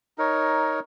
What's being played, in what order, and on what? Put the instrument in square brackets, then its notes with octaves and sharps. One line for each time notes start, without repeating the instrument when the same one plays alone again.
[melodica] D#4 A#4 C#5